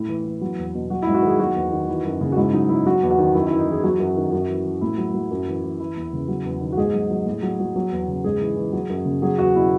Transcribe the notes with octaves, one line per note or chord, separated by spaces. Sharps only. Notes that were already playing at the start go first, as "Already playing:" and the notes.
Already playing: A2 E4
E3
E3
F#3
E2
B2
F#3 F#4
E4
G#2
F#4
D#3 G#4
F#3 F#4
E2
D#3
E3
F#2
C#3
F#4
G#2 E4
F#3 D#4
F#3 E4
F#3 F#4
E2
F#4
D#3
F#2 E4
E4
E3
D#4
E3 G#4
F#3 F#4
F#2
D#3
F#2
E3
E3
A2 E4
F#3
F#3
F#2
E3
E3
E3 E4
E2
C#3
F#3
E2
D#3
F#4
G#2 G#4
F#3
F#3
A2
F#3
F#3
F#3
E2
C#3
G#2 G#4
E3
E3
F#3
F#2
C#3
F#3 G#4
E2 F#4
B2 E4